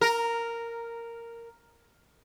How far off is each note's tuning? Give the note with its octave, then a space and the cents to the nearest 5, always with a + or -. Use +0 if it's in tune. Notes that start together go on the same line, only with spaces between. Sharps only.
A#4 -5